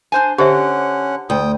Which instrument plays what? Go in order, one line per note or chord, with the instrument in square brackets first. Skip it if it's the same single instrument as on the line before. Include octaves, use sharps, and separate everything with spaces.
[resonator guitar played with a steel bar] D4 C5 G#5
[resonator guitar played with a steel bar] D3 [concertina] C#4 F#5 [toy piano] G4 C5 E5
[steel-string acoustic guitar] D2 [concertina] G5 D#6